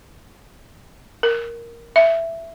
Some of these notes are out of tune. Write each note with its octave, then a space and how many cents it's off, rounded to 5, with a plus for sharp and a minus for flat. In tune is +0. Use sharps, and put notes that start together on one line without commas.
A#4 +0
E5 +10